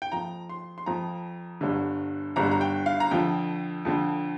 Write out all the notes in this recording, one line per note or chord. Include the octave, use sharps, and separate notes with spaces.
G5
F2 F3 A#5
C6
C6
F2 F3 A#5
G1 G2 D3
G1 G2 D3 A#5
A#5
G5
F5
A#5
F2 D3 F3 G5
F2 D3 F3